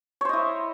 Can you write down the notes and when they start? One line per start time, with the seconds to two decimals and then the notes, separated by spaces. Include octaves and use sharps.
0.21 C#5
0.25 C5
0.29 D#5
0.33 E4